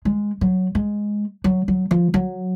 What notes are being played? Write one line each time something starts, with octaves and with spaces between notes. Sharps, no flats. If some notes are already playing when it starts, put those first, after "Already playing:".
G#3
F#3
G#3
F#3
F#3
F3
F#3